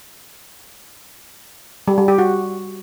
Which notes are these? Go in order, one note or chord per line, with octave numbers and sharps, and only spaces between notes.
G3
G3
G4
F#4